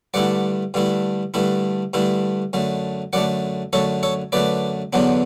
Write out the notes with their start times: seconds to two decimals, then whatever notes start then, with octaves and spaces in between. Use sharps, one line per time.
0.14 G2 D3 A3 E4 D5 F#5
0.74 G2 D3 A3 E4
1.34 G2 D3 A3 E4
1.94 G2 D3 A3 E4
2.53 F#2 D3 A3
3.13 F#2 D3 A3 D5 F#5
3.73 F#2 D3 A3 A4 C#5
4.03 A4 C#5
4.32 F#2 D3 A3 B4 D5
4.93 E2 D3 F#3 B3 D4